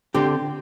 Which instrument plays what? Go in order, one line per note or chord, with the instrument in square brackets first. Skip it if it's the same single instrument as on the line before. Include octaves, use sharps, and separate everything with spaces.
[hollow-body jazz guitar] D3 C4 G4